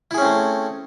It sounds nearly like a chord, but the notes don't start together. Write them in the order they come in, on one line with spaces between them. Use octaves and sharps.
E4 G#4 C#4 C4 A3